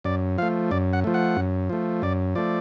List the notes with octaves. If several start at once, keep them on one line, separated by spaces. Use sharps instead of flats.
F#2 D5
F3 A3 F5
F#2 D5
F#5
F3 A3
F#5
F#2
F3 A3
F#2 D5
F3 A3 D5